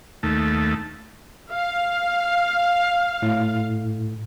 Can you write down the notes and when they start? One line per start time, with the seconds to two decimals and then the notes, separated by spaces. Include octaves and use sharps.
0.23 D#2 A3
1.53 F5
3.22 A2